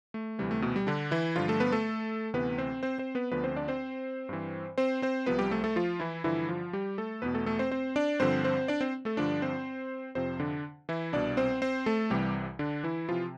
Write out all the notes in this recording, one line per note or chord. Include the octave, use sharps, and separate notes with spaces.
A3
D2 C3 E3 G3
A3
B2 B3
G3
D3 D4
E3 E4
G2 D3 F3 F4
A3 A4
B3 B4
A3 A4
D2 C3 E3 B3 B4
C4 C5
C4 C5
C4 C5
B3 B4
D2 D3 F3 B3 B4
C4 C5
D4 D5
C4 C5
G2 E3
C4 C5
C4 C5
C2 C3 F3 B3 B4
G3 G4
A3 A4
A3 A4
F3 F4
E3 E4
G2 D3 E3 F3 E4
F3 F4
G3 G4
A3 A4
E2 B2 B3 B4
A3 A4
A3 A4
C4 C5
C4 C5
D4 D5
G2 D3 F3 C4 C5
C4 C5
D4 D5
C4 C5
A3 A4
G2 D3 F3 D4 D5
C4 C5
F2 C3 F3 C4 C5
D3 D4
E3 E4
C2 B2 D4 D5
C4 C5
C4 C5
A3 A4
C2 C3 E3 G3 G4
D3 D4
E3 E4
C3 E3 F3 F4